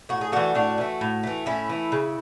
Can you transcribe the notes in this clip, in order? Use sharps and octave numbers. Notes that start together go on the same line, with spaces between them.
A2 F#4
G#4
E3 A3 D4 F#4
A2 D4 F#4
E3 A3
A2
E3 A3
A2 C#4 E4
E3 A3
C#3